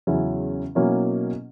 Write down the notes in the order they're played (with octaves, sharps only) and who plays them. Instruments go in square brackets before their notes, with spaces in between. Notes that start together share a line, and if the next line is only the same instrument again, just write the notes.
[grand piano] E2 C#3 F#3 C#4 E4
B2 F#3 A#3 C#4 E4